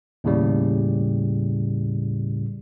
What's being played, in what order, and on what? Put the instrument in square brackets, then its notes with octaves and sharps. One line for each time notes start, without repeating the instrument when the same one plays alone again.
[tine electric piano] D#2 A2 C#3 G3